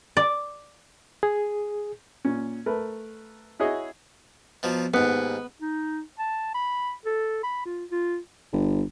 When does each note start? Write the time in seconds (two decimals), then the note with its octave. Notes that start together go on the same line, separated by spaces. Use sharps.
0.17 D5
1.23 G#4
2.25 A#2 C#4
2.66 A3 A#4 B4
3.59 E4 F#4 G#4 C#5 D#5
4.63 B2 F3 F#3
4.94 D#2 G#2 B3
5.61 D#4
6.19 A5
6.54 B5
7.06 A4
7.43 B5
7.65 F4
7.91 F4
8.53 G1